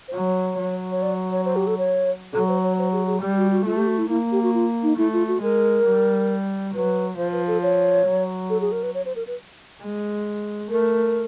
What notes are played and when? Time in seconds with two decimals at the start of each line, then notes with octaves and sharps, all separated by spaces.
0.08 C5
0.13 F#3 C#5
0.58 F#3
0.92 C#5
1.02 D5
1.31 C#5
1.45 C5
1.56 G4
1.67 A4
1.78 C#5
2.33 F#3 A4
2.48 C5
2.63 C#5
2.78 C5
2.93 G#4
3.07 G#4
3.22 G3 G4
3.37 F#4
3.51 F#4
3.65 A3 F4
3.77 G4
3.88 F#4
3.98 E4
4.10 A#3 E4
4.32 G4
4.43 F#4
4.54 F4
4.83 D#4
4.97 A3 E4
5.13 F4
5.28 F#4
5.42 G#3 A#4
5.86 G3
6.75 F#3 B4
7.18 F3 C5
7.33 B4
7.47 A4
7.63 C#5
8.06 F#3
8.50 A4
8.61 G#4
8.72 A#4
8.83 B4
8.94 C#5
9.06 C5
9.16 A#4
9.27 B4
9.82 G#3
10.70 A3 A#4